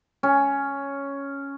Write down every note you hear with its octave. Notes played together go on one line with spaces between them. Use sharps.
C#4